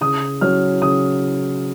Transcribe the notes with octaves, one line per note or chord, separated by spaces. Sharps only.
C#3 D#6
F#3 C#4 F6
C#3 D#6